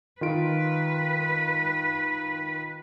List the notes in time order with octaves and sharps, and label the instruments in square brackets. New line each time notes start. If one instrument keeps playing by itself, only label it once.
[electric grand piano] D#3 F4 D7 [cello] B4